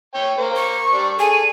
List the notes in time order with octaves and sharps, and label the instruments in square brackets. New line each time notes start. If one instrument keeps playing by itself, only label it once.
[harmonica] C#5 G5
A#3 C5
[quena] C#6
[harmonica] G3 D4
[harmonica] G#4 A4 [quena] G#5